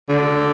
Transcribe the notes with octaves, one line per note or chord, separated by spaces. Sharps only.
D3